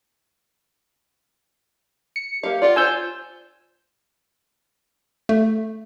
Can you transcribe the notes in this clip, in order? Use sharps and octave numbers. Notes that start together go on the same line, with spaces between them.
C#7
A#3 G4 F5
F4 D5 F#5
D4 C5 G#5 E6 G6
A3